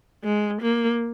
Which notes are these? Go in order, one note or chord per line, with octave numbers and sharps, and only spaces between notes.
G#3
A#3